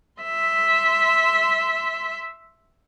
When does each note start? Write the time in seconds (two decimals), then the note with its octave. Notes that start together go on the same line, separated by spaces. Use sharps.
0.22 E5 C6